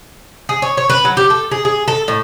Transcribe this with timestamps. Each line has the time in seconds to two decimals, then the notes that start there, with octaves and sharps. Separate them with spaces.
0.49 G#4
0.62 C#5
0.77 C#5
0.90 B4
1.05 F#3
1.17 G4
1.30 A4
1.51 G#4
1.65 G#4
1.88 A4
2.08 A2